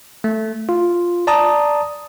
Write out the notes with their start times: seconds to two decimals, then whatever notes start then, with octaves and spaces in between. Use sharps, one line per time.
0.24 A3
0.69 F4
1.27 D5 A5 A#5 D#6